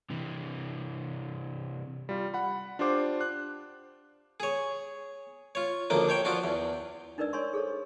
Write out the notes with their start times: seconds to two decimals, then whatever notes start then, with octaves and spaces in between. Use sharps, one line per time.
0.10 C3 E3
2.09 G3 F4
2.34 F#5 B5
2.79 D4 F4 G4 C5 D6
3.21 F#6
4.40 G#4 C#5
5.55 F4 C#5
5.90 A1 D2 F3 A#3 D4
6.09 C5 C#5 G5
6.25 F3 D4 F4 F#4
6.44 E2
7.18 D4 D#4 A#4 B4 D5 E6
7.33 A#4 C#5 G#5 C6 C#6
7.53 G#4 A4 C5 C#5